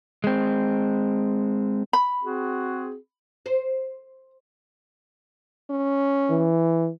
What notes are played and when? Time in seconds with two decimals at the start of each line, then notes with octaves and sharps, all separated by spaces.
0.24 G#3 C4
1.93 B5
2.23 C4 F#4 G#4
3.46 C5
5.70 C#4
6.30 E3